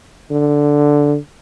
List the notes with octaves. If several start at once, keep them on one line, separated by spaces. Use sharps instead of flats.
D3